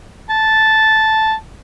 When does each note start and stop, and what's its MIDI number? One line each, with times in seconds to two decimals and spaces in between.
0.30 1.33 81